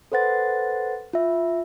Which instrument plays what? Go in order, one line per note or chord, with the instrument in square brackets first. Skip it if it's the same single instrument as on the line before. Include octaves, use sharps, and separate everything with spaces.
[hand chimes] A4 B4 C5 F#5 A6
F4 E5